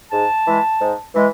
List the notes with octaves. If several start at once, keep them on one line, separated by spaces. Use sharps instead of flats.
G#2 A5
E3 G#3
G#2
E3 G#3